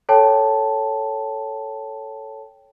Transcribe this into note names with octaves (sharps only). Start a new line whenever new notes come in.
A4 C#5 G5 A5